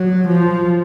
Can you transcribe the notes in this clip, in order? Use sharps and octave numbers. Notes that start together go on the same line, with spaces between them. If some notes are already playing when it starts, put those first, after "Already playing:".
Already playing: F#3
F3